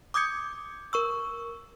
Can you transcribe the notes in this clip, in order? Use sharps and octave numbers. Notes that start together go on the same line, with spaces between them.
D6 D#6 G6 G#6 C#7
A#4 C#6 E6